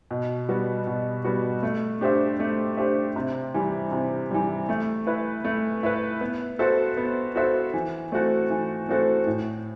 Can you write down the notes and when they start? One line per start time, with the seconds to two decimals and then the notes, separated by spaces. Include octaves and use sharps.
0.11 B2
0.49 G3 B3 F#4
0.87 B2
1.24 G3 B3 F#4
1.63 A3
2.01 D4 G4 C5 E5
2.40 A3
2.77 D4 G4 C5 E5
3.16 C3
3.54 E3 G3
3.92 C3
4.31 E3 G3
4.69 A3
5.07 E4 B4
5.45 A3
5.83 E4 B4
6.21 B3
6.59 F#4 A4 C5 E5
6.97 B3
7.36 F#4 A4 C5 E5
7.74 E3
8.12 A3 C4 F#4 A4
8.50 E3
8.89 A3 C4 F#4 A4
9.27 A2